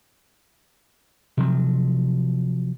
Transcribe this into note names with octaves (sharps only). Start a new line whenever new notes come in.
C3 F3 F#3